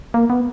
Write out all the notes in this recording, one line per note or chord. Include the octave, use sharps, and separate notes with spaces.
A#3
B3